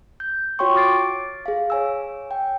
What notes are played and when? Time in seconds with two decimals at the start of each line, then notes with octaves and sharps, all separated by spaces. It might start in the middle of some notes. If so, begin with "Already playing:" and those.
0.20 G6
0.59 F4 F#4 C#5 G5 C6 C#6
0.75 D6 F6 A6 C7 D7
1.46 G#4 F5
1.70 C#5 G#5 E6
2.31 G5